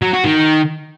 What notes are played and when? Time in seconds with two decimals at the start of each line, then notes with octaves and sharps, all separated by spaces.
0.02 F#3
0.13 F#4
0.25 D#3